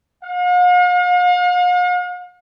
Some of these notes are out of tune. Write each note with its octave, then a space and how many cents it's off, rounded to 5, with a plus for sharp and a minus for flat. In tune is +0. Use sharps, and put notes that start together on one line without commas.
F5 +45